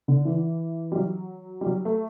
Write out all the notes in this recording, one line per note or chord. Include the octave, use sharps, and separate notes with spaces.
D3
E3
G3
F#3
G3
F#3
A3